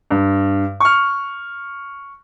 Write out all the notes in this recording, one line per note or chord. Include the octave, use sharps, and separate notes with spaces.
G2
C#6 F6